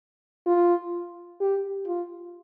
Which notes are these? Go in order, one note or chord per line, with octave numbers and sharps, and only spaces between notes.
F4
G4
F4